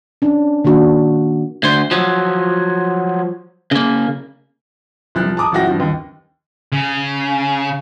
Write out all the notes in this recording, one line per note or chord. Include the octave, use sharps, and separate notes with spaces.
C#4 D4
D#3 A#3 D4 F#4
D2 C5
F3 F#3
C#3 A#3
C2 F3 F#6
A5 A#5 D6 D#6
A1 F3 E4 F#4 G5 A#6
G2 F3
D#2
C#3